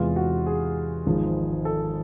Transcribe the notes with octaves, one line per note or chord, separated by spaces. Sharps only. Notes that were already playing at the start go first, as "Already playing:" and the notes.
Already playing: E2 C3 E3 G#3 F4
F#4
G#4
G#1 G#2 F3 G#3
A4